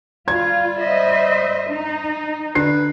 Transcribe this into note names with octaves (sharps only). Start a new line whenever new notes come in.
G3 F4 G#6
C5 D#5 E5
D#4
D3 B4 C7